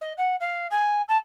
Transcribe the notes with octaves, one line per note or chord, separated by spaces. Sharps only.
D#5
F#5
F5
G#5
A5